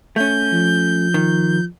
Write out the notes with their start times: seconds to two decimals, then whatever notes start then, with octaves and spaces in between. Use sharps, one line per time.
0.16 A3 C#4 G6
0.53 F3
1.14 D#3